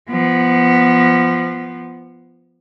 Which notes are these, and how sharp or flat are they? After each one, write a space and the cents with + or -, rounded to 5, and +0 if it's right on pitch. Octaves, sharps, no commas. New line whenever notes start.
F3 -15 B3 +0